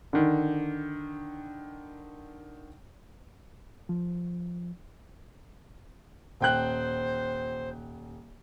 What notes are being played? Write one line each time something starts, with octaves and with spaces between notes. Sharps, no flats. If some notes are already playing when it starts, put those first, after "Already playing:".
D3 D#3
F3
D#1 C5 G5 F#6